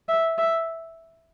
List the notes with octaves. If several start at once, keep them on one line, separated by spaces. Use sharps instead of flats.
E5
E5